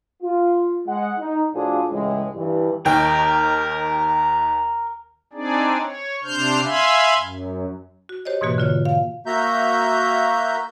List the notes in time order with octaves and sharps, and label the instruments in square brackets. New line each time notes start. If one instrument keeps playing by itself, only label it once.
[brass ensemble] F4
G#3 F#5
D#4
A2 F3 D4 F4 F#4 G#4
C#2 A2 C#3 E3 G#3
G2 E3
[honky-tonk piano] D#2 D#3 G5 [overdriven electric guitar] A#4
[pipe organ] C4 D4 D#4 G#4 D5
C#5
C3 D4 C5 F6 G6
E5 F5 G#5 B5 C6
F#2
[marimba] F#4
G4 C5 C#5 D#5
G#2 B2 E3 A#3 F#4
D3 F4 C#5
F5
[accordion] A#3 F#4 E5 A#5 G6